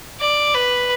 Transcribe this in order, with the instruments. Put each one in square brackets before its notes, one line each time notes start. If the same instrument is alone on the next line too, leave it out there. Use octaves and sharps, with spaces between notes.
[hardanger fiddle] D5
B4